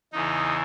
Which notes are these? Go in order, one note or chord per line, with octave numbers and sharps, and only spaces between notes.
E2 C#3 E3 D#4